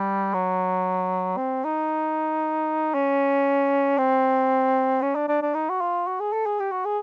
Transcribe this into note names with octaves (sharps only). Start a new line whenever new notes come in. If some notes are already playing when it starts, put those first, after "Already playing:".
Already playing: G3
F#3
C4
D#4
C#4
C4
C#4
D4
D4
D4
D#4
F#4
F4
F#4
G#4
A4
G#4
G4
F#4
G#4